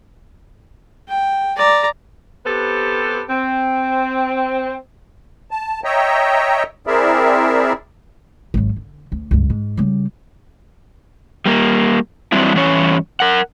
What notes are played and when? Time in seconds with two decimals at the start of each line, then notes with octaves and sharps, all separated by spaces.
1.09 G5
1.56 D5 A#5
2.46 C3 B3 G4 A4 B4 C5
3.30 C4
5.51 A5
5.84 C#5 D#5 E5 G5 A#5
6.87 C4 E4 G#4 A#4 D5 E5
8.54 G#1 F#3
8.76 D3
9.12 D2
9.31 C#2 G2
9.50 G#2
9.77 C#3 G3
11.46 G3 A#3
12.32 E3 F#3 G3 C4 D4 E4
12.55 G2 E3 C#4 C#5
13.20 A#4 F#5